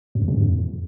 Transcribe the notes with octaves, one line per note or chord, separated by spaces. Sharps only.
F2
E2
C3
G2
F2